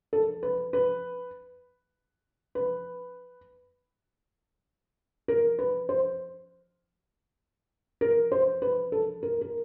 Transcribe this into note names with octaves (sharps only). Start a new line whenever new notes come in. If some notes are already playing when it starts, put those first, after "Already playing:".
A4
B4
B4
B4
A#4
B4
C5
A#4
C5
B4
A4
A#4
A#4